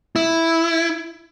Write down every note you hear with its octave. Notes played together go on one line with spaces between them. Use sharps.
E4